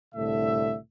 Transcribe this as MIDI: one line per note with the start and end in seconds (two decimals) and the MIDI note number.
0.15 0.76 36
0.15 0.76 45
0.15 0.76 50
0.15 0.76 69
0.15 0.76 76